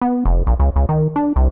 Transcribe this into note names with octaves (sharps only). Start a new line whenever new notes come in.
B3
F1
A#1
C#2
C#2
D#3
D4
C2